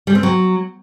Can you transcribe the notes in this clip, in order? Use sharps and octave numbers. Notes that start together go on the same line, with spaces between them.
G3
C4
F#3